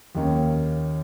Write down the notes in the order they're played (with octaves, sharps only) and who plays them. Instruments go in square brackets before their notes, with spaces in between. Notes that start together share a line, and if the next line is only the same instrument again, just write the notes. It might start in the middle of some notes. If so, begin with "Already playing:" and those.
[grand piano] D#2 D#3 A#3 C#4